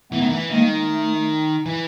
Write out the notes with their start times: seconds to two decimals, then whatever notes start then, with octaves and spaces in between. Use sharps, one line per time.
0.12 E3 A3 B3
0.21 D#3
0.30 E3
0.51 D#3 G#3 A#3
0.90 A3
1.66 E3